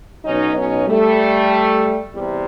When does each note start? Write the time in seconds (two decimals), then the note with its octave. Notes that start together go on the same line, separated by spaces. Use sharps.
0.25 B1 B2 F#3 C#4 D#4
0.57 C#4 D#4
0.88 G3 A3
2.13 E2 C3 G3